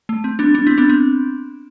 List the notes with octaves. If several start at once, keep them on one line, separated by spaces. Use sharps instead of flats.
A3
C4
B3 D4
B3 D4
C4 E4
B3 D4
C4